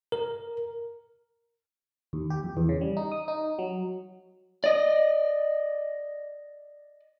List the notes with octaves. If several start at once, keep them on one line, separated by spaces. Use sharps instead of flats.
A#4
D#2
G4
F2
E2
C#3
G3
D#4
D#6
D#4
F#3
D5 D#5